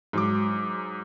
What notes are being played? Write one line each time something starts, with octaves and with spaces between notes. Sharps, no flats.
G#2 F#3 D6